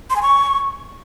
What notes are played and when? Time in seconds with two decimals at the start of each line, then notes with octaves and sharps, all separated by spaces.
0.10 C6
0.16 G#5
0.22 C#6